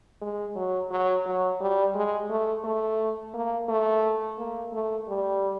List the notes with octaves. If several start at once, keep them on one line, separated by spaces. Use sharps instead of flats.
G#3
F#3
F#3
F#3
G3
G#3
A3
A3
A#3
A3
A#3
A3
G3